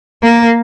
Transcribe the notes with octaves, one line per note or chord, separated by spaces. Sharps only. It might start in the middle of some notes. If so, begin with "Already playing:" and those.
A#3